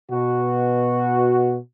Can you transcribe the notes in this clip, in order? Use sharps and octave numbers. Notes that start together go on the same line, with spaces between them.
B2 F#4